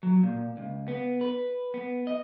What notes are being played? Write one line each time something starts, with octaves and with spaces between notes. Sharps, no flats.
F#3
A#2
C#2
B3
B4
B3
D#5